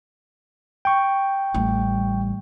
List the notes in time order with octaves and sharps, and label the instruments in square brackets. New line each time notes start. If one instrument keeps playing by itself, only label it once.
[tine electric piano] G5 C#6
[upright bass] A1 G3